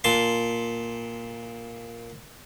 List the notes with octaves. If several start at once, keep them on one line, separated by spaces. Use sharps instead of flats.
A#2 A5 C6